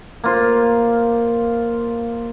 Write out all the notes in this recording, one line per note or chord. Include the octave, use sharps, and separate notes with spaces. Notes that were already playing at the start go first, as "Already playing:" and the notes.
A#3 F4 C5